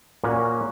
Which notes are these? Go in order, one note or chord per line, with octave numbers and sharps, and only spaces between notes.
A#2 A#3 C#4 F#4 C#5